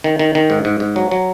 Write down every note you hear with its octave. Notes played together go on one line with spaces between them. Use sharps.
D#3
D#3
D#3
G#2
G#2
G#2
F#3
F#3